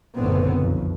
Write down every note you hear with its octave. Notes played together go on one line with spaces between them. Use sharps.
F#1 B1 A2 D3 B3 C4
B1 F2